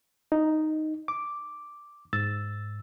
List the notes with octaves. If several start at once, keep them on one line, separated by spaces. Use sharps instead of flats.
D#4
D6
G#2 E6 A6